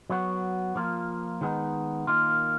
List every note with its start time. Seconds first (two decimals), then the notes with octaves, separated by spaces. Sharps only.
0.10 F#3 B3 F#4
0.75 F3 A#3 F4
1.41 D#3 G#3 B3 D#4
2.07 D#3 A#3 F4